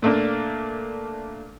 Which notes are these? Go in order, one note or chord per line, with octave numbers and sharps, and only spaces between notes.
A#2 A3 A#3 D4